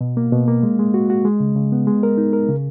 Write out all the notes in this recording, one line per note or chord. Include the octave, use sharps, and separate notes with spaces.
B2
A#3
B2
A#3
G#3
G#3
F#4
F#4
G#3
C#3
C#3
B3
G#3
A#4
D#4
A#4
C#3